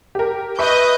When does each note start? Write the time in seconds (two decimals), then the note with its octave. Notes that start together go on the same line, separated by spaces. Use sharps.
0.15 G4 A#4
0.59 B4 D#5 E5 C#6 G6